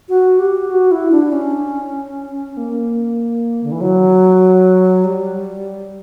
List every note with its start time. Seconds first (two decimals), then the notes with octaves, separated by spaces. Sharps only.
0.09 F#4
0.39 G4
0.70 F#4
0.92 E4
1.12 D4
1.32 C#4
2.57 A#3
3.63 D3
3.72 E3
3.81 F#3
5.04 G3